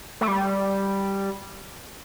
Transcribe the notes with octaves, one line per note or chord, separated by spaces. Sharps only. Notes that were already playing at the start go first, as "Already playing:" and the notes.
A3
G3